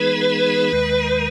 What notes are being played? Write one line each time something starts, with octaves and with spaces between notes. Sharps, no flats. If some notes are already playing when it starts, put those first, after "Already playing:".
Already playing: E3 G#3 B3 D#4 G#4 B4
D#2 D#3 G#3